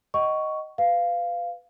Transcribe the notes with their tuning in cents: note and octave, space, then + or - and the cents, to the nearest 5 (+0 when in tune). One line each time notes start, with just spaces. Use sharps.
D#5 +0 F#5 +35 C#6 +5
B4 +20 F5 -5